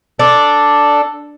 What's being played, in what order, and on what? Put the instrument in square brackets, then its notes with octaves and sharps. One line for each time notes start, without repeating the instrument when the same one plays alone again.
[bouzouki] D4 [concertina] A4